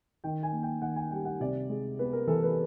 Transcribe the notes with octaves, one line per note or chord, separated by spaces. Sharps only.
D#3 G5
G#5
A#3
G5
D#3 F#5
G#5
G3 G5
F#5
C3 D5
G#3
B3 B4
A#4
E3 A4
B4